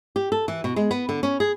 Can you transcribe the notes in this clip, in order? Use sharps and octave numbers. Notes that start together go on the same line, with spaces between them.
G4
A4
E3
B2
G#3
B3
D3
C#4
G#4